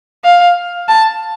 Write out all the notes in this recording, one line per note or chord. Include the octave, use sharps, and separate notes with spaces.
F5
A5